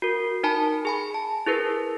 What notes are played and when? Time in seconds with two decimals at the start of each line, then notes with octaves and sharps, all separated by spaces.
0.02 F#4 A#4
0.43 D#4 A#4 G#5 A5 B5
0.85 G#4 G#5 B5
1.14 A5
1.46 E4 G#4 A#4 B4